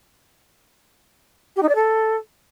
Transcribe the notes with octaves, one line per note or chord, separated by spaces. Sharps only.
G4
D#4
D5
A4